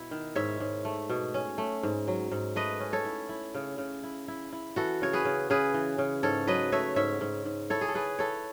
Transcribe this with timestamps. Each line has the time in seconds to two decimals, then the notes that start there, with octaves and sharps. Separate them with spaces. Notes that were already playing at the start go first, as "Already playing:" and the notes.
Already playing: B2 E4
0.11 D#3
0.36 G#2 C#5 E5
0.60 G#2
0.85 A3
1.10 B2
1.34 C#4
1.58 A3
1.83 G#2
2.08 F#3
2.32 G#2
2.56 A3 B4 D#5
2.80 C#4
2.93 A4 C#5
3.05 E4
3.29 E4
3.55 C#3
3.78 C#3
4.03 E4
4.28 E4
4.53 E4
4.76 E3 F#4 A4
5.02 C#3 C#5
5.13 G#4 B4
5.25 C#3
5.50 C#3 G#4 B4
5.74 E3
5.98 C#3
6.23 G#2 A4 C#5
6.47 F#3 B4 D#5
6.72 A3 C#5 E5
6.96 G#2 C#5 E5
7.21 G#2
7.45 G#2
7.70 E4 A4 C#5
7.81 G#4
7.88 A4
7.94 E4 G#4 B4
8.19 E4 A4 C#5